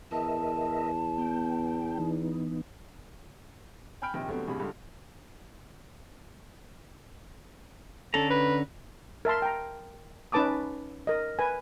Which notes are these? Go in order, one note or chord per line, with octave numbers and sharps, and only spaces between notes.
E2 A#4 D#5 E5 A5
B3 G5
E3 B3 D#4
G5 G#5 B5 F6 G6 D7
A#1 C3 D#3 G5
D3 F#3 G3 A3 B3 C4
A1 G2 C3 G#4 B5
C#2 G2 D3
D3 C#4 A4 A#5
B4
A#4 E5 A5 C6
G5 A#5
C#4 D#4 B4 A5 D6 D#6
A#4 D#5
B4 G#5